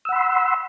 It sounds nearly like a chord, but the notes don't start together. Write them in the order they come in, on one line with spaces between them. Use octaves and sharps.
E6 F#5 B5 C6